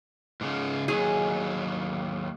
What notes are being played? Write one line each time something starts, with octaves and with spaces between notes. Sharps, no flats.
G#2 C#3
D#2 F#3 G#4